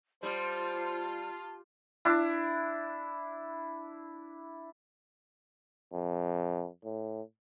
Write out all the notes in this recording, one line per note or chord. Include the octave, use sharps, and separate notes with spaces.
G3 F4 C5 A5
D4 E4
F2
A2